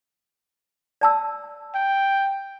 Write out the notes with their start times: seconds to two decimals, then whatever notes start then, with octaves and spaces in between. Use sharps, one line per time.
1.01 D5 A5 E6
1.75 G5